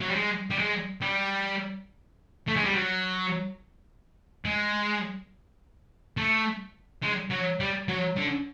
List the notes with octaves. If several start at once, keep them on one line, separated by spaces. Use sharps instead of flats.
F#3
G3
G#3
G3
G#3
G3
A3
G#3
G3
F#3
G#3
A3
G#3
F#3
G3
F#3
D3